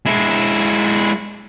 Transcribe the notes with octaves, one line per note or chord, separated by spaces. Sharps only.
G#3 E4